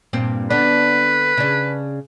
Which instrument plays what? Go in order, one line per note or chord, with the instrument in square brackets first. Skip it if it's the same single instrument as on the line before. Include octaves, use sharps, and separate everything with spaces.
[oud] G2 A#2 C4
[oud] D3 B3 D4 [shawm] B4
[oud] C#3 D4